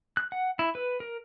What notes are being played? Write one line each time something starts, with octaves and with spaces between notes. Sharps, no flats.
F#6
F#5
E4
B4
A#4